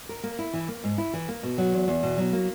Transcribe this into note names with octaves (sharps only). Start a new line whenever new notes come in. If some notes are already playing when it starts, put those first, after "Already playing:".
A#4
A#3
E4
E3
A#3
G#2
E4
E3
A#3
B2
F#3
E2
E2
B2
F#3
A#3